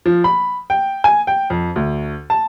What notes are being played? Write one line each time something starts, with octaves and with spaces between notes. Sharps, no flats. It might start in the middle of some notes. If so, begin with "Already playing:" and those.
F3
B5
G5
G#5
G5
F2
D2
A5